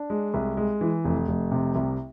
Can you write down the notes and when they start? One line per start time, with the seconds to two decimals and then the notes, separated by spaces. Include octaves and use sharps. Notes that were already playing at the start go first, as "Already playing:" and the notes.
Already playing: D4
0.10 G#3
0.34 C2
0.57 G#3
0.81 E3
1.05 F1
1.28 F1
1.51 C3
1.75 C2